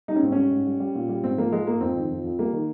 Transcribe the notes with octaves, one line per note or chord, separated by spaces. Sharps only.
G3 D#4
C#4
G#2 C4
G3 C#4
G#2
G3
G3
A#2
G3
G#2 C4
F3 A#3
F3 G#3
G#2 A#3
F2 C4
D#3
F2
F2
G3 A#3
D#3